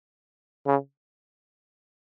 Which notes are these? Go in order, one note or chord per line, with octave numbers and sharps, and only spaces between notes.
C#3